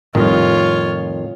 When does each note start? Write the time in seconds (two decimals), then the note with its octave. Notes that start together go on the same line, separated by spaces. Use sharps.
0.15 F2 A2 D#3 G3 F4 C#5